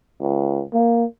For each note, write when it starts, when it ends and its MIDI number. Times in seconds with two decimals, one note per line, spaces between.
0.21 0.62 37
0.73 1.05 58